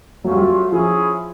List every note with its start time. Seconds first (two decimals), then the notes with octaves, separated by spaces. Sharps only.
0.24 F#3 A3 C#4 F4
0.33 G3
0.41 F#3
0.72 F3 C#4 E4 G#4